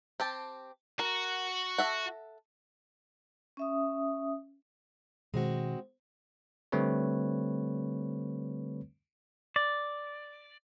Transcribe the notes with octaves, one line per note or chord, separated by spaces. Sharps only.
C4 G4 A5
F#4 A#4
A4 E5 F#5
C#4 E5 D#6
B2 D#3 G#3 C4 F#4
D3 G3 A3 C4 B4 C#5
D5